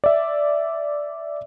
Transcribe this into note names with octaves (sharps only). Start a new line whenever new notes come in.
D5 E5